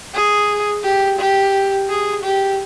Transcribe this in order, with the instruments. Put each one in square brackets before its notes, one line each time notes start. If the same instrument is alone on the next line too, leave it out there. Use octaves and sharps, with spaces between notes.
[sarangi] G#4
G4
G4
G#4
G4